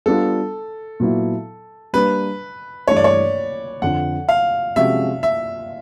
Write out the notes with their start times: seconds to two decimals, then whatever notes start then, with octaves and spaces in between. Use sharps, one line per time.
0.06 G3 B3 D4 F4 A4
1.00 A#2 F#3 B3 E4
1.93 G3 A#3 D4 B4
2.88 G2 E3 A3 D4 C#5
2.97 D5
3.04 C#5
3.82 F2 D3 F3 F#5
4.29 F5
4.76 C3 F3 G#3 C#4 F#4 E5
5.23 E5